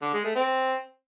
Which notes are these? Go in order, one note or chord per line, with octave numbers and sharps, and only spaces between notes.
D3
G#3
A3
C4